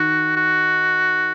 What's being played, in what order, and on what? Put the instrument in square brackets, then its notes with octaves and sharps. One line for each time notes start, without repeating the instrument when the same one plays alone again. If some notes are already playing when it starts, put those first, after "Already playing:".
Already playing: [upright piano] D#3 [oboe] F#4
[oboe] F#4